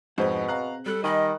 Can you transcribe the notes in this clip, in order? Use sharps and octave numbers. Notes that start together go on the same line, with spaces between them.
F2 G#2 B2 C4 G#4 C5
F5 A#5 F#6
G3 A4 F#6
D#3 D#5 G#5 B5